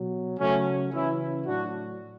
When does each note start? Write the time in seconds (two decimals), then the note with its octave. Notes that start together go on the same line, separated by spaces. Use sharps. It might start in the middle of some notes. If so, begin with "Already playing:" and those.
Already playing: B2 F#3
0.39 C#3 F#3 A3 C#4
0.92 C#3 E3 C#4 E4
1.46 A2 F#3 D4 F#4